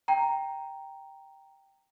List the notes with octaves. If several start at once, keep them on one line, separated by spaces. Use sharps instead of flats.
G5 A#5